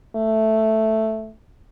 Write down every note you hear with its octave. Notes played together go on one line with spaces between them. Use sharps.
A3